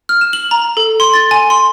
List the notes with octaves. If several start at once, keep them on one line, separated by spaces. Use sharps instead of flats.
F6
E7
F#7
A#5
A4
C6
A6
G#5
C6